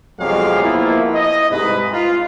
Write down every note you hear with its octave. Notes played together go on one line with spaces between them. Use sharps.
B1 F2 F#3 G#3 G4 F5
F3 A#3 B3 E4 F4
D#5
C2 G#2 B4
D#4 F4